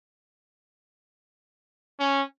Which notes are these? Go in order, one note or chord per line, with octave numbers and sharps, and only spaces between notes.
C#4